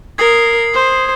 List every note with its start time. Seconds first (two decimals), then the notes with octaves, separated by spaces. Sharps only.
0.18 A#4 D#6 G#6 C7
0.73 C5